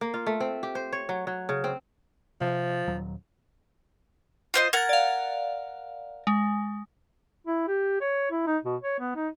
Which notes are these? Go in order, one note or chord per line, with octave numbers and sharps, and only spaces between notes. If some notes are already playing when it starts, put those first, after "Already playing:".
A#3
F4
A3
C4
G4
C5
C#5
F#3
F#3
C#3
C4
C3 F3
D#1 D#2 F#3
F4 C5 D#5
A#4 F#5 G#6 A6
D5 F5
G#3
E4
G4
C#5
E4
D#4
B2
C#5
B3
D#4